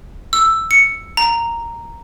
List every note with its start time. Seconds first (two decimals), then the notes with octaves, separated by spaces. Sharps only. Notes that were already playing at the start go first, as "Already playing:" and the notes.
0.33 E6
0.71 C#7
1.17 A#5